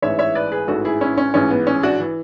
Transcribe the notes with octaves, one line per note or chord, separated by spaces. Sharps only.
A1 G#2 E3 C#5 E5
C#5 E5
B4 D5
G#4 B4
A1 G#2 E3 F#4 A4
E4 G#4
C#4 E4
C#4
A1 G#2 E3 C#4
B3
C#4
D4 F#4
E3